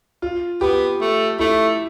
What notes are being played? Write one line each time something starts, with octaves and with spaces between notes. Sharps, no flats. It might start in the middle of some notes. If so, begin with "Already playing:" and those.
F4
B3 G4
A3
A3 E4